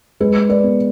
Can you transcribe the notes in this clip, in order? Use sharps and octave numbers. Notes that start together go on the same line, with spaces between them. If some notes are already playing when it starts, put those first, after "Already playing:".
G#3 G#4 B4
B4 D5
B3